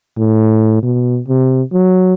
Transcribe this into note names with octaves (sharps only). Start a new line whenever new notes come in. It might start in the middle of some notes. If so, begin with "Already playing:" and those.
A2
B2
C3
F#3